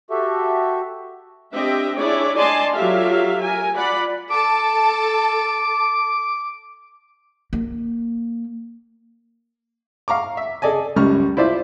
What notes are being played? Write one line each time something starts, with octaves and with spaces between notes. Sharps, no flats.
F#4 G4 A4 E5
C4 D4 G4 D#5 E5 G5
D4 E4 G#4 C#5 D5
D5 D#5 G#5 A5 C6
F#3 F4 G4 A4 E5 F5
A#4 G#5
F4 D5 F#5 B5
A4 A5 D6
A#3
F5 A#5 C#6 D6
E5
G#4 A4 D5 D#5 G#5
C#2 F#2 G3 C#6 F6
E4 F4 C5 D5 E5